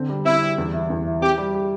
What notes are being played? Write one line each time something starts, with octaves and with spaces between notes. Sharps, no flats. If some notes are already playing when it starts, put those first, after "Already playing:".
Already playing: D3 C4
G3
C4 E4
G3
E2
E3
E2
E3
C4 G4
G3
G4